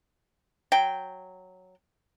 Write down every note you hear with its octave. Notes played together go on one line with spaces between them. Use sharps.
F#3 G5